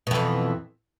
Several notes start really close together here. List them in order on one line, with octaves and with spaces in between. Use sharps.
B2 F2 E3